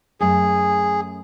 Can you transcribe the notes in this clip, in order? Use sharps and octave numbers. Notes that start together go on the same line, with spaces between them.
F#2 A3 G#4